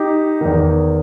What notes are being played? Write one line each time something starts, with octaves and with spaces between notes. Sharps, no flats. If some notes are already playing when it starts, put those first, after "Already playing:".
Already playing: D#4 G4
E2 D#3